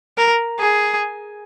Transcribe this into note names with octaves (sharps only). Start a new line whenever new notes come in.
A#4
G#4